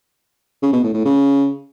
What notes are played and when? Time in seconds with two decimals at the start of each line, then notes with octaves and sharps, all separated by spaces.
0.62 C#3
0.73 B2
0.83 A2
0.94 A2
1.05 C#3